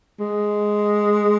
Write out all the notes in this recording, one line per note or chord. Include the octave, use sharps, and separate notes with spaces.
G#3